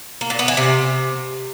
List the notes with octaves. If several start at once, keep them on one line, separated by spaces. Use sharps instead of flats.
A#3
A#2
B3
E3
C3